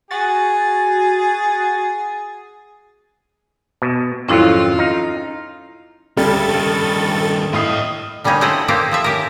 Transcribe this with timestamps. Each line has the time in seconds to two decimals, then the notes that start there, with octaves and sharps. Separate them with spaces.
0.11 F#4 G#4 A6
3.82 B2
4.29 G#1 F2 F#3 C#4 E4 F4 A4
4.79 D#4 F5
6.17 D2 C#3 G3 A4 A6
6.48 G2 D#3
7.53 A2 D#5 F5 D#6 C7
8.24 D3 G3 A#3 C#4 D#4
8.41 A3 C4 E4 C#5 D#5 F#5
8.68 A#3 C4 D#4 G4 A4
8.91 F3 F4 E5
9.04 C#4 G4 A#4